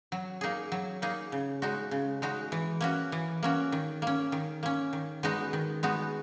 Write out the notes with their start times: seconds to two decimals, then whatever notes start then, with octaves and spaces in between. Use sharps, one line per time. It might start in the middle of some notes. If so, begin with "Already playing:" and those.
0.12 F#3
0.41 A#3 D#4 G#4
0.72 F#3
1.02 A#3 D#4 G#4
1.32 C#3
1.62 G#3 D#4 F#4
1.91 C#3
2.22 G#3 D#4 F#4
2.52 E3
2.81 A#3 C#4 F#4
3.12 E3
3.43 A#3 C#4 F#4
3.72 D#3
4.02 A#3 C#4
4.32 D#3
4.63 A#3 C#4
4.93 D#3
5.23 G#3 B3 D#4 F#4
5.53 D#3
5.83 G#3 B3 D#4 F#4